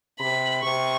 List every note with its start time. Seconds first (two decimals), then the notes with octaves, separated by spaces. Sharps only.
0.20 C3 B5
0.63 C3 C#6